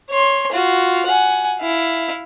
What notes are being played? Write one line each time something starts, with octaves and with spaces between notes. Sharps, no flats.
C#5 C6
F4 F#4
F#5 G#5
E4 F5